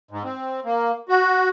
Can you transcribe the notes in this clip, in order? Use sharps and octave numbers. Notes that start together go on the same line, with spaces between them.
G#2
C4
A#3
F#4